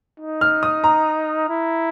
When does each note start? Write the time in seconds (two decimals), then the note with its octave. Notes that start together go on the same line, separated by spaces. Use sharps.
0.20 D#4
0.41 F6
0.63 D#6
0.84 A#5
1.49 E4